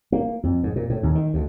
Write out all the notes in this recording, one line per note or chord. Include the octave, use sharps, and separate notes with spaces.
A#3
F2
G#2
A#2
A2
D#2
D#3
D2